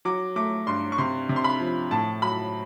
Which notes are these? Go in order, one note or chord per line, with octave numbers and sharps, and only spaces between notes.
F#3 D6
A3 D6
G2 C6
C#6
C3 C6
C3
C6
B5
F3
A2 A5
F#3 B5